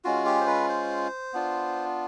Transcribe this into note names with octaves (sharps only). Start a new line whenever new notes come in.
G#3 C#4 F4 F#4
G4
C5
B4
C5
B3 D4 F4